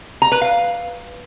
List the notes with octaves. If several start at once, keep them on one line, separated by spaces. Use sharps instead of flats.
A#5
B4
F5